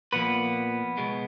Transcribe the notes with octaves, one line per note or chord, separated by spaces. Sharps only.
A#2 F3 A#3 B3 B4
C#2 B2 G#3